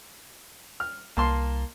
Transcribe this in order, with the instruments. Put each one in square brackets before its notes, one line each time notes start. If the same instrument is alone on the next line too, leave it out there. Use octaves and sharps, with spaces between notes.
[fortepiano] F6
[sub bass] C2 [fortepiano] A#3 A5 C6